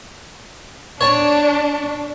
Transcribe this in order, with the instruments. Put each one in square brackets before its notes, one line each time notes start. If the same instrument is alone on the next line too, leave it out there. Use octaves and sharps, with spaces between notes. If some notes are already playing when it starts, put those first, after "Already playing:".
[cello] D4 [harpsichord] C#5 A5